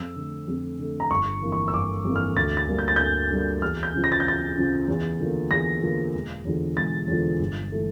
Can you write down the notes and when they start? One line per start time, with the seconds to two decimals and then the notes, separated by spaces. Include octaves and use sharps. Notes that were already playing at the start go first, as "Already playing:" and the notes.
Already playing: F2 E6
0.16 D3 A3
0.48 F2
0.79 D3 A3
1.00 A#5
1.11 G1 C#6
1.42 F2 E3 A#3
1.52 C#6
1.68 E6
1.73 G1 D6
2.05 F2 E3 A#3
2.16 F6
2.36 D2 A6
2.57 A6
2.68 D3 G3 A#3
2.79 G6
2.88 A6
2.96 D2 G6
3.31 D3 G3 A#3
3.62 E2 F6
3.83 G6
3.94 C#3 F3
4.04 A#6
4.12 A6
4.20 G6
4.25 E2 A6
4.56 C#3 F3
4.88 E2
5.20 D3 F3 A#3
5.51 E2 A#6
5.82 D3 F3 A#3
6.14 E1
6.45 E2 D3 F3
6.77 E1 A6
7.08 E2 D3 F3
7.39 G1
7.71 E3 A3